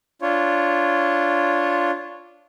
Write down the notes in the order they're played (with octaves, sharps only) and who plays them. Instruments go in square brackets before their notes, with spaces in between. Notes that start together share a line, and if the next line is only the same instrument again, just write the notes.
[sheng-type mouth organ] D4 F4 C#5